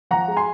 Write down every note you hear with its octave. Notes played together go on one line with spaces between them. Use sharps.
F3 F#5 A#5
G#3
G#5 C6